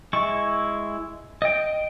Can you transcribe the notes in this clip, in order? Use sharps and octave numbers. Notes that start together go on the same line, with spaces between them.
G#3 E4 C#6
D#5 G5